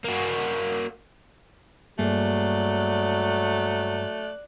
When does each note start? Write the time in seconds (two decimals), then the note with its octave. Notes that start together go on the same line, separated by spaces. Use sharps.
0.05 A#3 F#4
1.99 G2 F#3 A3 A#3 G#4 D5 F#6